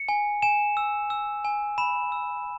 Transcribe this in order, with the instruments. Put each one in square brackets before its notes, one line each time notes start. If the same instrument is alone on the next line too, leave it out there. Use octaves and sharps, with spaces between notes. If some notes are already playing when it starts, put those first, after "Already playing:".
Already playing: [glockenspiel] C#7
G#5
G#5 E7
E6
E6
G#5
B5 E7
E6